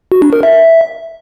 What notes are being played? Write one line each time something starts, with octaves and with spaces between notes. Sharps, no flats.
F#4
D4
A#4
E5